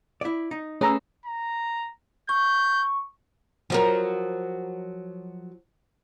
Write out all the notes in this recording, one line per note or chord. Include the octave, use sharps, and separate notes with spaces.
E4 D5
D#4
A3 C#4 G#4 B4 A#5 E6
A#5
C#6 G6
F3 F#3 A#4